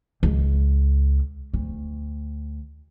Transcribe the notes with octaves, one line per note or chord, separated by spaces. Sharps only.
C#2
D2